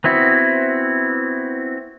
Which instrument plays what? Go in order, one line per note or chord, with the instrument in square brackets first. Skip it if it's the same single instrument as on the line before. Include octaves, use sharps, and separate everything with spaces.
[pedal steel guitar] B3 C4 E4 F#4